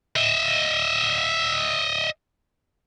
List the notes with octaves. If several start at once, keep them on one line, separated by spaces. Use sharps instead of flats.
D#5 E5